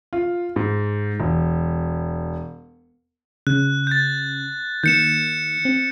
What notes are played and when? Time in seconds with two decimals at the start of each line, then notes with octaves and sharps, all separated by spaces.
0.13 F4
0.56 G#2
1.20 E1
3.47 C#3 F#6
3.87 G6 A6
4.84 D#3 A#3 G6 C#7 E7
5.65 C4